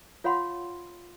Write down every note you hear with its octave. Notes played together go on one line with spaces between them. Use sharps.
F4 C#5 F5 F#5 B5 C6